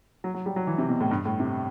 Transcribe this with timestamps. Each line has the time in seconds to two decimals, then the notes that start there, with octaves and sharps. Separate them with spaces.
0.24 F#3
0.34 F#3
0.46 G3
0.56 F#3
0.67 E3
0.78 C3
0.89 B2
1.01 A2
1.11 G2
1.25 A2
1.40 C3